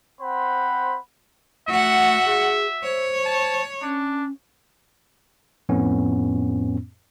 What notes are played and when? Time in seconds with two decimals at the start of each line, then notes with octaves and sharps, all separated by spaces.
0.21 C4 C5 F#5 B5 C6
1.68 A3 F#4 E5 F#5
2.25 G#4
2.83 C5 C#5
3.25 A5
3.82 C#4 D4
5.69 F2 A2 B3 C#4